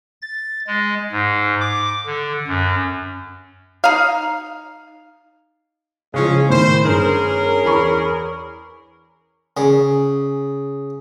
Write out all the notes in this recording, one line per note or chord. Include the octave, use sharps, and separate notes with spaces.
A6
G#3
G#2
D6
D3
F#2
D#4 F5
C#3 F3 G#3 C#4
A2 D#3 C5
G1 C#4 G#4 A#4
E2 B5 C#6
C#3